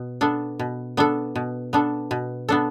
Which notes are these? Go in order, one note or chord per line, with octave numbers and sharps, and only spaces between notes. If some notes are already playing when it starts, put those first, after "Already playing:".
Already playing: B2
B3 D4 A4
B2
B3 D4 A4
B2
B3 D4 A4
B2
B3 D4 A4